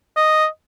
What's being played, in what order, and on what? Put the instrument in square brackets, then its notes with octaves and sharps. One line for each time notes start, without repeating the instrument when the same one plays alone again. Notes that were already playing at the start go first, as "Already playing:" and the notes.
[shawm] D#5